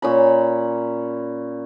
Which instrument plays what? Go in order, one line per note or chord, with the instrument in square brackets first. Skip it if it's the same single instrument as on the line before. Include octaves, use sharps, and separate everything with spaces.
[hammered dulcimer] A#2 C#4 B5